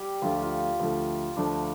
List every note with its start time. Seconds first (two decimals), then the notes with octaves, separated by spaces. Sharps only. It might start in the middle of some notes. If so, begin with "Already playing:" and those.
Already playing: G3 G4
0.22 D2 D3 F3 A3 F4
0.33 G4
0.42 F4
0.80 D2 D3 F3 A3
1.36 D2 D3 F3 A3 D4